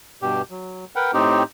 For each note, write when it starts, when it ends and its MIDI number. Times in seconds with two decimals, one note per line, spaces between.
0.22 0.42 43
0.22 0.42 47
0.22 0.42 67
0.51 0.85 54
0.96 1.11 70
0.96 1.11 71
0.96 1.11 78
0.96 1.11 79
1.14 1.43 45
1.14 1.43 60
1.14 1.43 63
1.14 1.43 67